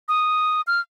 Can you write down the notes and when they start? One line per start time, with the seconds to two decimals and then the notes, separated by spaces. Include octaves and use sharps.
0.08 D#6
0.67 F6